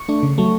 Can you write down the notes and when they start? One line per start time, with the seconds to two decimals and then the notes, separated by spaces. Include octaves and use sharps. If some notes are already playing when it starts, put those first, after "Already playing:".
Already playing: C#6
0.09 A3 D4
0.23 C#3
0.38 F#3 A3